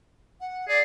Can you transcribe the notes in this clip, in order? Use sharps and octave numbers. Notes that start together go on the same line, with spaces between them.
F#5
G#4 D5